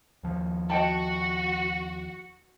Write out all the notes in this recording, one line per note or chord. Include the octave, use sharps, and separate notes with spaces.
D#2 F3
F#4 D#5 G5 A5